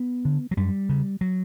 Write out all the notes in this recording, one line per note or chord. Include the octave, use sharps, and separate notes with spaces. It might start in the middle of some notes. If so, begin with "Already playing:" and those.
Already playing: B3
D3
F#3
F#2 G3
C#3
F#3